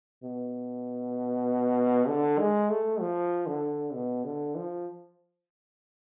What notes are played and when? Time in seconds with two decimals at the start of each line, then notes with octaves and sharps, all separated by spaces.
0.24 B2
2.08 D3
2.39 G#3
2.70 A3
3.00 F3
3.47 D3
3.94 B2
4.25 D3
4.55 F3